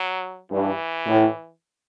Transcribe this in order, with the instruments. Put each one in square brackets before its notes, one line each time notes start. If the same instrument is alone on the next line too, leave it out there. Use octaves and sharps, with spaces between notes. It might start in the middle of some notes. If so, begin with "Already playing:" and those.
Already playing: [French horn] F#3
[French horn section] G2 [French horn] E3
[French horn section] A2